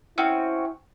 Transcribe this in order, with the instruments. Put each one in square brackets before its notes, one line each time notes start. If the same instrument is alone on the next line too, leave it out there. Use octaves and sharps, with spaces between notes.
[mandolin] C4 C#4 F#4 [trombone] E4